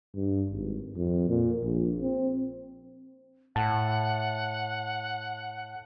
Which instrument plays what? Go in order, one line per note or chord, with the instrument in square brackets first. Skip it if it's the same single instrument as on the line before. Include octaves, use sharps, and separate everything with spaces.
[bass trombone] G2
G#1
F2
A#2
A#1
C4
[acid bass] A2 [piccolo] F#5 [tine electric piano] A5